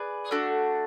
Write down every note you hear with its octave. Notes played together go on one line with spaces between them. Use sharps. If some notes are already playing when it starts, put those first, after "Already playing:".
Already playing: G#4 B4 D5
A3 D4 F#4